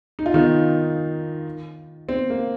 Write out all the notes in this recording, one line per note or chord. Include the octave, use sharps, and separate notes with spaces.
D#4
F4
D#3 D#4
C4
A#3